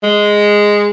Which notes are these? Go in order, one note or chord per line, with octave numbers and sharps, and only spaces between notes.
G#3